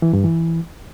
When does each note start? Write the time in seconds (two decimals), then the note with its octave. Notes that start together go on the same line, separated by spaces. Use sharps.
0.02 E3
0.13 G2
0.24 E3